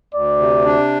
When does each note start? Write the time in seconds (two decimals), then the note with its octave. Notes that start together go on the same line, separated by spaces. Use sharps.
0.14 D2 D5
0.39 C3
0.65 D4